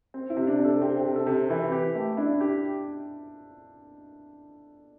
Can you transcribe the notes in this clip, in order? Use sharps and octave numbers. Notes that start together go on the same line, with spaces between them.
C4
E4
C3
D4
C3
A4
C4 G4
G4
C3
A4
C3
E3 E4
G4
A3
D4 E4
D4
G4